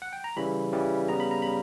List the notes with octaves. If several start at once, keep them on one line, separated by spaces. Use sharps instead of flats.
F#5
G5
A#5
C#3 E3 G3 B5
C#3 E3 G3
C#3 G3 B3 A#5
B5
A#5
C#3 G3 B5